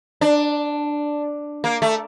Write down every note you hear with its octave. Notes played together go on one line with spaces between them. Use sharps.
D4
A#3
A3